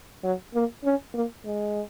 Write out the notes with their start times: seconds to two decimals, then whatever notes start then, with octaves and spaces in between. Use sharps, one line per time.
0.24 F#3
0.54 A#3
0.84 C#4
1.15 A#3
1.45 G#3